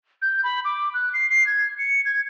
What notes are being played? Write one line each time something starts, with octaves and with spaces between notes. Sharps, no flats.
G6
B5
D6
F#6
C7
C7
G#6
C#7
G#6